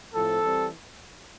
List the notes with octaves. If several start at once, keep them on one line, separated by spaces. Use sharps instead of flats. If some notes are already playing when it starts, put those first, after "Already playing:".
A2 F3 C4 A4
E3 G3 C4